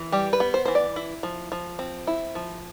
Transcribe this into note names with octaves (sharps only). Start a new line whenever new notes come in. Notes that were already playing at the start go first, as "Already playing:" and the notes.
Already playing: E3
G3 G4
B4
B3
C5
E3 C5
D5
E4
F3
F3
C4
E4
F3